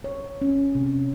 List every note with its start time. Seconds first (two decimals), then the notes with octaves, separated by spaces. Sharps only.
0.04 C#5
0.42 C#4
0.75 C3